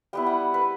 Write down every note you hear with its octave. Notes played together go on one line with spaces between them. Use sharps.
G3 B3 E4 G5
F#5
B4